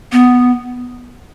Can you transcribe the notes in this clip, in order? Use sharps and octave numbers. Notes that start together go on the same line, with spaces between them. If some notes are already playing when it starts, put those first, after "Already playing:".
B3